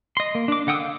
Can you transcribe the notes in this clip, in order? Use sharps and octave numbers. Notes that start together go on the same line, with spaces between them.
D#5 C6
A#3
D4 D6
D3 F#5 G5 D#6 E6
F5